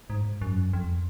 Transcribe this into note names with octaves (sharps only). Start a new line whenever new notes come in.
G#2
F#2
F2